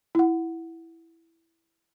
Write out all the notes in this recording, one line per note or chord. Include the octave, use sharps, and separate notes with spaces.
E4 F#5